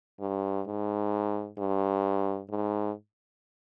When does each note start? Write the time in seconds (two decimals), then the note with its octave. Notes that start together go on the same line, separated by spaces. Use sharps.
0.20 G2
0.67 G#2
1.58 G2
2.50 G#2